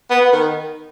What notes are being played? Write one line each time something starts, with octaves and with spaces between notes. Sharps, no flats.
B3
B3
D#3